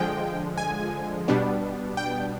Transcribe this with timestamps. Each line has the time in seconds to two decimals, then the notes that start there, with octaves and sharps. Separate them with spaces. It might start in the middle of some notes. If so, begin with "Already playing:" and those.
Already playing: D3 F3 G#3 G5
0.58 G#5
1.28 B2 G3 B3 D4
1.97 G5